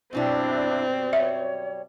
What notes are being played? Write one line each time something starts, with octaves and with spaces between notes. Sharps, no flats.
F#2 B2 G3 C4 D4 E4
C#5 E5